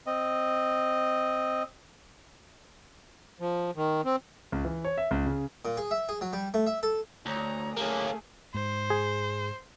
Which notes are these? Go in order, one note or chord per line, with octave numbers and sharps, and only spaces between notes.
C4 D#5
F3
D#3
C4
C#2
E3
C#5
E5
C#2
C#3
A#2
G#4
E5
G#4
F#3
G3
A3
E5
A4
D2 C#5 A#5
A3 A#3 C#4 G#4
G#2 C5
G#4